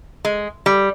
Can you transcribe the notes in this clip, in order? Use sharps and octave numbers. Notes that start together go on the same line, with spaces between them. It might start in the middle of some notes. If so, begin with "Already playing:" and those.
G#3
G3